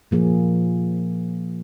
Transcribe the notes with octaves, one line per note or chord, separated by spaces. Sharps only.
A#2 F3 A#3 G#4